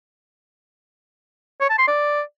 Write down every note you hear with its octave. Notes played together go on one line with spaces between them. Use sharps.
C#5
A5
C6
D5